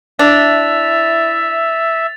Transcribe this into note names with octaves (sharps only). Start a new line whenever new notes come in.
D4 E4 E5 A6 F7